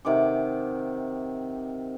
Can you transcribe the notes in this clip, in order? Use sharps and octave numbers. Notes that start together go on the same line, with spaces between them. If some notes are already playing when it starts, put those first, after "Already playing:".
C3 D#3 F#5 D6